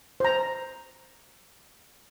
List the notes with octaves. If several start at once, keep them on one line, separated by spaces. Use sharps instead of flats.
C5 A#5